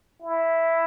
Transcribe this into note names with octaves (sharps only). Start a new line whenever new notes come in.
E4